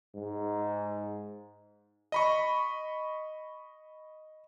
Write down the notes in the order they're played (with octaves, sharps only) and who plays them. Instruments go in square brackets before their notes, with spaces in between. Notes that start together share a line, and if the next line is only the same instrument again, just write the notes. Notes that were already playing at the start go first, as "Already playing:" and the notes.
[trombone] G#2
[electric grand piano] D#5 B5 C#6